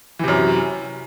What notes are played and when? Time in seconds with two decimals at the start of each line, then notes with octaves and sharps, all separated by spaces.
0.19 E3
0.24 C3
0.28 F#2